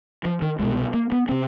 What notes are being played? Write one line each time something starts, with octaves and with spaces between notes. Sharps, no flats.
F3
D#3
C2 B2 G#3
A#3
B3
C3 C4